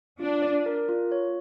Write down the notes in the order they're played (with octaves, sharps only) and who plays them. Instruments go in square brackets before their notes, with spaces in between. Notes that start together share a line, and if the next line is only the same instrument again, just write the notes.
[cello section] D4 [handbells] F4
[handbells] D5
A#4
F4
C#5